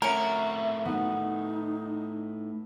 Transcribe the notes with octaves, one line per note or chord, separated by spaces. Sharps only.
A2 C#4 F#4 A#4 E5
B3 D#4